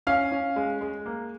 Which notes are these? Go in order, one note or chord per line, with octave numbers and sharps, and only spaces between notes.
C#4 F5
C#4
G#3
G#3
A#3